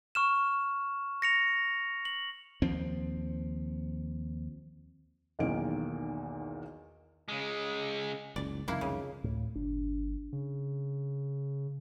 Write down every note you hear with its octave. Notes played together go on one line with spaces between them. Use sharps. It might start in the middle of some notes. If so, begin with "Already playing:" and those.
C#6 F6 E7
A#6 C#7 F7
F#7
D#2 F3 C4
B1 E2 D#3 A#3 D7
C#3 G#3
F#1 C#2 D5
C2 F2 D#3 A#3 E4
C#3
D2 A2
G1 D4
C#3